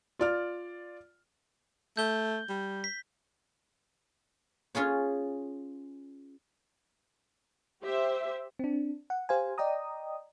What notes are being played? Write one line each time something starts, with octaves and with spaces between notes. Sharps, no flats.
F4 D5 F6
A3 G6 G7
G3
B6
C#4 F4 G#4 C#5
G4 C5 E5
C4 D4
F#5
G4 C5 F5 G#5
D5 D#5 G5 A#5 D#6